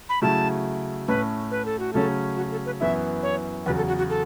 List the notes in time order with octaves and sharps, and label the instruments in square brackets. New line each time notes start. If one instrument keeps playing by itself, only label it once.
[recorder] B5
[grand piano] C#3 F#3 A3 E4 [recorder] A5
[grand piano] A2 A3 C#4 [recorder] B4
[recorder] B4
A4
F#4
[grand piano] C#3 F#3 A3 C#4 [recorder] A4
[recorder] F#4
A4
B4
[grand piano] F#2 E3 B3 E4 [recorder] E5
[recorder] C#5
[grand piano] E2 C#3 F#3 [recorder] B4
[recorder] A4
F#4
F#4
A4